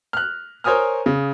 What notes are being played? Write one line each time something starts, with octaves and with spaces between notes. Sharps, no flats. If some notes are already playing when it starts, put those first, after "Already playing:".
F6 F#6
A#4 C5 C#5 G#5 D#6 F6
C#3